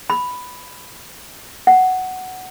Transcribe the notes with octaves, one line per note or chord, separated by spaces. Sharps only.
B5
F#5